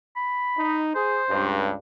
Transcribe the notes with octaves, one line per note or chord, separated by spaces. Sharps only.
B5
D#4
G#4 C5
C#2 G2